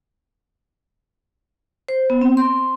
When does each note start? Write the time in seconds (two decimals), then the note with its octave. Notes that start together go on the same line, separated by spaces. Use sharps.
1.89 C5
2.10 B3
2.21 C4
2.37 C6